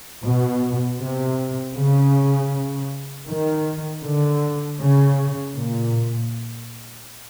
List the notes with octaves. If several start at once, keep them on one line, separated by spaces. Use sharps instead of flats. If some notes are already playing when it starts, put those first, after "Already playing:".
B2
C3
C#3
D#3
D3
C#3
A#2